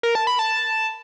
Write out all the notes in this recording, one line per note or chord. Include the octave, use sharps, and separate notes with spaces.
A#4
A5
B5
A5